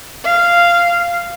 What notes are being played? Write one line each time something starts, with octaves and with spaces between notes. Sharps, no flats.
F5